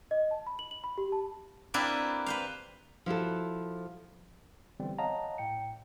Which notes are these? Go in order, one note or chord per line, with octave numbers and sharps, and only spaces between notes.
D#5
A5
B5
F#7
F#7
B5
G4
A5
A#3 C4 D4 E4 G4 B4
B4 C5 F5
F3 E4 F#4 A4
D3 E3 G3 B3 C4
C#5 D#5 F5 F#5 A5 A#5
A2 G5 C#7